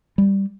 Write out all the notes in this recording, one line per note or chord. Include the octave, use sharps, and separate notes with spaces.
G3